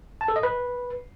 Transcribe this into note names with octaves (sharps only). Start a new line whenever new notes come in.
A5
A4
D#5
B4